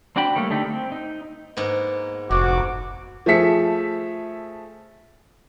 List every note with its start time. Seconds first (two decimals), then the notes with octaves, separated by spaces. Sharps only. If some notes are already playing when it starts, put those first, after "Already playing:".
0.16 C4 D4 F#4 G5 B5
0.36 G3 A3 A#3 C#5
0.50 D3 A3 D#4 G4
0.68 C4
0.92 D#4
1.57 G#2 A#3 B3
2.31 F1 G#2 F#4 D6
3.26 F3 A3 G#4 E5 B6 C#7